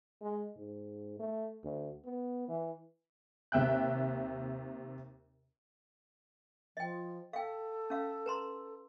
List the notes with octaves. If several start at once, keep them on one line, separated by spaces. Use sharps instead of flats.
G#3
G#2
A3
D2
B3
E3
D#2 C3 E5 G5 F#6
F3 D#5 G5
A4 F5 G5
C#4 F5
B4 A#5 C6